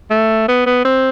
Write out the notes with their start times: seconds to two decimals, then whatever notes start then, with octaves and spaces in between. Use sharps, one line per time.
0.10 A3
0.48 B3
0.66 B3
0.85 C4